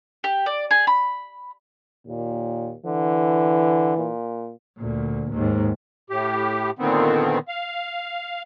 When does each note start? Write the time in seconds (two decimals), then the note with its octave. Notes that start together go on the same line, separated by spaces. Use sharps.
0.24 G4
0.46 D5
0.71 G#4
0.87 B5
2.07 D#2 A#2
2.85 D3 E3
3.98 A#2
4.78 D2 A#2
5.33 D#2 G#2
6.10 A2 G4
6.79 A#2 D3 D#3 B3 C4
7.48 F5